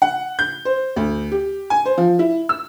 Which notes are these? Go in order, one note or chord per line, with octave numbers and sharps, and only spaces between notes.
F#5
G6
C5
D2
G4
G#5
C5
F3
E4
E6